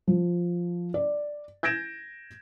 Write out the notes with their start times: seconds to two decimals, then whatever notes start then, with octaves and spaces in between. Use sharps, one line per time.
0.07 F3
0.94 D5
1.63 G6 G#6 A#6 D7 E7